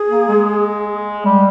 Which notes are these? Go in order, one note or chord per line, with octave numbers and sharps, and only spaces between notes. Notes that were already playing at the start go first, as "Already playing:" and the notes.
Already playing: G#4
A#3
G#3
G3